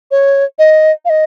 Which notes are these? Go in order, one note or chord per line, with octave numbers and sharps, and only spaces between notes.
C#5
D#5
F5
D#5